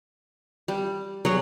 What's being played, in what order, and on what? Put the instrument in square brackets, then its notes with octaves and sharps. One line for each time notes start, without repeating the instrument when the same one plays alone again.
[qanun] G3
[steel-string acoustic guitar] F#3 [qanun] G#4 C#5